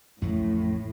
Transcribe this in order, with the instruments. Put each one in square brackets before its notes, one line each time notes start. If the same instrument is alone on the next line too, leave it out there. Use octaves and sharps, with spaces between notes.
[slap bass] A1 F2 A3 [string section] A2